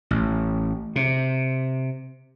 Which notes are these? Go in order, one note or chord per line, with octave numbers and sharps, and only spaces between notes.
A1
C3